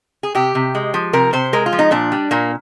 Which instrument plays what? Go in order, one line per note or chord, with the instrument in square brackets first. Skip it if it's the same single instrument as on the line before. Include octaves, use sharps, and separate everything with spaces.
[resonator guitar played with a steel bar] G#4
C3 G4
C3
G#3
F3
C3 A#4
C3 C5
G#3 A#4
F4
F3
D#4
A#2 D4
G3
A#2 A#3